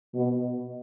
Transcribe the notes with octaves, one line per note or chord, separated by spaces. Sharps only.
B2